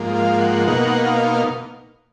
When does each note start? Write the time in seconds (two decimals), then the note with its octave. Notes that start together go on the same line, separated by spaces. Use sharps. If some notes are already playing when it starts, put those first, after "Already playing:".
Already playing: G#2 F3 A#3
0.16 F5
0.41 F#5
0.67 B2 A#3 D#4 F#5
1.06 F5